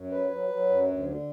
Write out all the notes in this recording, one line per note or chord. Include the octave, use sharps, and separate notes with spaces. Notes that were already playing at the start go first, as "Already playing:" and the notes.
Already playing: F#2
F#3 B4
F#3
F#3
F#2
D2
D3